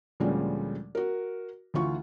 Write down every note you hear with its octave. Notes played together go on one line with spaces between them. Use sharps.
D2 A#2 F3 G3 G#3 C#4
F#4 A#4
D2 E3 F4 C#6